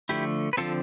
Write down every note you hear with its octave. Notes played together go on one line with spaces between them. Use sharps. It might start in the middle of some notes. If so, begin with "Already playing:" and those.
D3 F3 A3 E4 G4
B4
D3 F3 C4 F4 A4